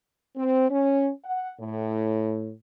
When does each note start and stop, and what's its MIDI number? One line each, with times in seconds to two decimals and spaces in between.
0.36 0.70 60
0.71 1.10 61
1.24 1.52 78
1.61 2.52 45